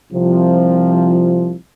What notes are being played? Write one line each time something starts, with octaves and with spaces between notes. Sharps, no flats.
C2 C3 F3